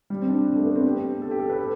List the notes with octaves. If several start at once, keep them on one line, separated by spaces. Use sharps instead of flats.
G3
C4
D4
D4
A3
B3
C4
G4
A4
G4
A4
B4
A4